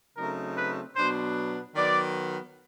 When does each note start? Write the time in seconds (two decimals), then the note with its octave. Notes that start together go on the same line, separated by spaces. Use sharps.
0.16 C#3 F#3 A3 C4 D#4 A#4
0.56 B4
0.95 B2 F#3 B3 D4 C5
1.76 D#3 F#3 B3 D5